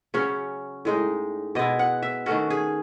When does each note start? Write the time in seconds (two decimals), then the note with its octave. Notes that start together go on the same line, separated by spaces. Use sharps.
0.14 C#3 F#3 C#4 C#5
0.85 A2 G#3 D#4
1.55 B2 G#3 B3 E4 D#5
1.79 F#5
2.02 E5
2.26 D#3 A3 C#4 F#4
2.50 G#4